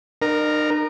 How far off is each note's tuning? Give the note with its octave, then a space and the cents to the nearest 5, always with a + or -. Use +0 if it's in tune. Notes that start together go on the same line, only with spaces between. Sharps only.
D#4 -45 A#4 +0